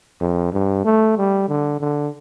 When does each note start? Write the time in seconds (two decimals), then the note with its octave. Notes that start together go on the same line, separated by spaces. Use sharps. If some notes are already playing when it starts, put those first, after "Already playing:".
0.20 F2
0.53 G2
0.85 A3
1.17 G3
1.48 D3
1.81 D3